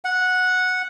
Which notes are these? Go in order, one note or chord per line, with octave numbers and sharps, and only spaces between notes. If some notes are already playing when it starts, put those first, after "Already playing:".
F#5